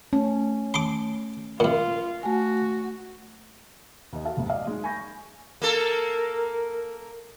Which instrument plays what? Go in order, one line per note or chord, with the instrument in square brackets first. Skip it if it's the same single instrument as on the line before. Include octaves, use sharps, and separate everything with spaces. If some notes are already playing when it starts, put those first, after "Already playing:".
[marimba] A3 [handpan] C#4
[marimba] A3 [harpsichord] C6 D6
[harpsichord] F#2 A#2 [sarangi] F4
[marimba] A3 G#5 [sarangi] F#4
[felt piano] D#2 D#5
F#4 A4 E5 F5 A5
F#1 D#2 G#2
D5 D#5 F5
F#3 G#3 D#4
G#5 B5 C#6 G6 A#6
[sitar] A#3 A4 [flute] A#4